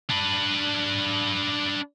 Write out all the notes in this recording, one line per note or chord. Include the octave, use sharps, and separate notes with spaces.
D4 B4